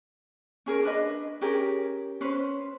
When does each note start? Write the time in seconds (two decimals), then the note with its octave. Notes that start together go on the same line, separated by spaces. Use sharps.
0.66 C#4 G#4 A#4
0.83 D4 B4 D#5
1.41 C#4 G4 G#4 A#4
2.21 C#4 B4 C5